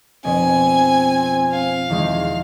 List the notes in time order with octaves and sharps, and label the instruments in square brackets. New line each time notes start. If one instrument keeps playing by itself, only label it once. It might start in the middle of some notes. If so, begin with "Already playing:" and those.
[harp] F1 B2 [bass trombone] C4 [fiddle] G#5
[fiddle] F5
[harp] E2 D#3 G#3